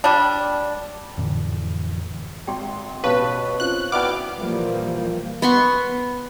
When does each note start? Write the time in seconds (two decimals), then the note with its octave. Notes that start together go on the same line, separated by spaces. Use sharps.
0.04 G3 D4
1.17 F2 A2 D3 E3
2.47 G#1 G5 C6
3.04 A1 B2 B4 C#5 F5 A5 C#6
3.60 C4 C#4 F4 F#6
3.92 B3 E4 F#4 D5 G5 D6 F6
4.38 A#2 E3 F3 G3 A#3
5.42 B3 C6 C#6